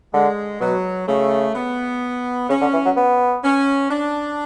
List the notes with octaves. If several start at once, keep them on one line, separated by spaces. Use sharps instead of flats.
D3 G#3
B2 F#3
C#3 A3
B3
C#3 C#4
D3
E3
F#3
B3
C#4
D4